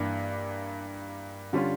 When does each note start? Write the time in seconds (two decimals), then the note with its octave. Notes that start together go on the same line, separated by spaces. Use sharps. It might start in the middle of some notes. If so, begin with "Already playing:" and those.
Already playing: G2 E3 A#3 D4
1.53 D3 G3 C#4 F4